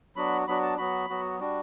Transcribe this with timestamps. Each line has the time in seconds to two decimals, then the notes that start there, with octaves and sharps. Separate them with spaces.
0.16 F#3 B3 D4 F#4 B5
0.47 F#3 B3 D4 F#4 B5
0.63 A5
0.78 F#3 B3 F#4 B5
1.10 F#3 B3 F#4
1.39 G3 D4 F#4